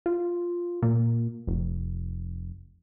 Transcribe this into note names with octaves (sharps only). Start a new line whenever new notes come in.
F4
A#2
F1